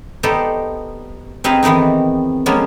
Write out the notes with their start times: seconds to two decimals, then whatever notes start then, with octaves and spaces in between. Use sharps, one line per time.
0.23 B3 D#4 G4 A4 C5 D5
1.44 C4 D#4 G#4 B4 C5 F5
1.63 D#3 E3 B3 C4 D#4
2.46 F3 G#3 A#3 B3 C#4